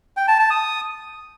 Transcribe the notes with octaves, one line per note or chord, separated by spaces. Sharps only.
G5
A5
A5
D#6